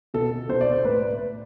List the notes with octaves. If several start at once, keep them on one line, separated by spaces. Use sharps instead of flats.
B2 A4
B2 C5
D5
C5
A2 B4